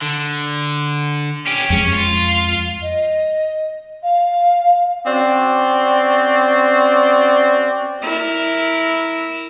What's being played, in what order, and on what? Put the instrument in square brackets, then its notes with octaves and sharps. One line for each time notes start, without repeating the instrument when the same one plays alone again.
[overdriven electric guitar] D3
C#4 G4
[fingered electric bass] F2 G#3 [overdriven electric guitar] C#4
[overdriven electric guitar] F4
[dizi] D#5
F5
[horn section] C4 C#4 F#4 D5
[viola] E4 A#4